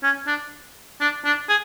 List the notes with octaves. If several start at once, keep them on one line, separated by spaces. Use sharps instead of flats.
C#4
D4
D4
D4
G#4